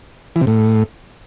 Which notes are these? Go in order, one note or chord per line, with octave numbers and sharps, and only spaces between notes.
E3
C3
A2